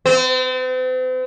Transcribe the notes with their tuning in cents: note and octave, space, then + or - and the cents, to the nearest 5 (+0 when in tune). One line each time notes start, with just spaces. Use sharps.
C4 -40